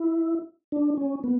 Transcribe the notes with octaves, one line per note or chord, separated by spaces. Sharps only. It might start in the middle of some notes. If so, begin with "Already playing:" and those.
Already playing: E4
D4
C#4
B3